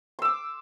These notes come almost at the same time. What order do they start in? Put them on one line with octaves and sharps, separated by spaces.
C6 E6 D6